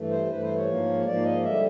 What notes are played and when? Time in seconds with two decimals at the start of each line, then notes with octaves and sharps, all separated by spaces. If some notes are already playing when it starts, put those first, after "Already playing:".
Already playing: G2 E3 A3
0.11 C5
0.30 G2 E3 A3 B4
0.43 C5
0.55 C#5
0.67 G#2 F3 A#3
1.06 G#2 F3 A#3 D5
1.25 D#5
1.44 D3 G3 E5